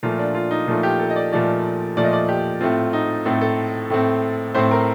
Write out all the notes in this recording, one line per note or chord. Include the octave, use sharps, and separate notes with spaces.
A#2 F3 A3 F4
D4
F4
D#4
A#2 F3 A3 F4
G4
A4
D#5
D5
A#2 F3 A3 D5
A#2 F3 A3 D5
D#5
D5
G4
A2 A3 C4 F4
D#4
A2 A3 C4 A4
A4
A2 A3 C4
A2 A3 C4 C5
A#4